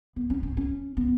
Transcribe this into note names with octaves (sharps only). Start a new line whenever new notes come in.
B3
C#4
C#4
C#4
B3